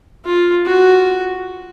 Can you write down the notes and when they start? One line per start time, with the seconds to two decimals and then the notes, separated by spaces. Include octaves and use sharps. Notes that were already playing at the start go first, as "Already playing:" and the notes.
0.25 F4
0.66 F#4